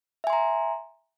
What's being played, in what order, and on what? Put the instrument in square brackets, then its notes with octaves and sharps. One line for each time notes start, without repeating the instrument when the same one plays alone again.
[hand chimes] E5
G#5
C6
A#5